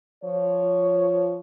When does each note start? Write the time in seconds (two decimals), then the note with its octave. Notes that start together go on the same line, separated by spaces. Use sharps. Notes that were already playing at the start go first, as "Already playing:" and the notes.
0.23 F3 C#5